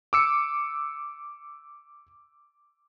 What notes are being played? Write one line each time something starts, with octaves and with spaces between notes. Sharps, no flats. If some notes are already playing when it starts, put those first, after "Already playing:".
D6 E6 C#7